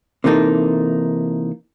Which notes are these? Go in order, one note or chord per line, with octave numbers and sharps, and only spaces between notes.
C3 E3 A#3 D#4 A4